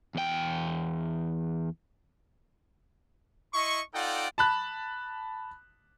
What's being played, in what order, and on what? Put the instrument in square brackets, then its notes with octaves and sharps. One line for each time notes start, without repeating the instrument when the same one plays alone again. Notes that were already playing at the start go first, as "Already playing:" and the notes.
[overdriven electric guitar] E2 G5
[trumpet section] E4 D#5 C6 C#6
D#4 F4 A4 D5 F#5 G5
[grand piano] A5 B5 F#6